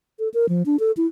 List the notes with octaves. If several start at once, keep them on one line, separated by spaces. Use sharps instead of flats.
A4
A#4
F3
D4
A4
E4